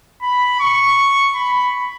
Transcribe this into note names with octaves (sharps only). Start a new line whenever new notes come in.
B5
C#6
B5